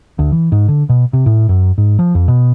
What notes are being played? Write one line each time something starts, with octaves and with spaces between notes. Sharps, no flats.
D2
E3
G#2
D3
B2
C3
A2
F#2
G#2
F3
F2
B2